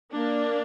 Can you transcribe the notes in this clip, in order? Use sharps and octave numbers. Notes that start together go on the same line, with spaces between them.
A#3 D4